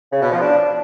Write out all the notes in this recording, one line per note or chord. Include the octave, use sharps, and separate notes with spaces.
C#3
B2
F3
D4